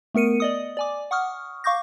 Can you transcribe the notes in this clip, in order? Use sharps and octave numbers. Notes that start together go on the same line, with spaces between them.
A3 B3 A#4 C#7 D#7
D5 D#5 D#6
D5 G#5 D6
F#5 C#6 D#6 F6
F5 C#6 D6 G6 A#6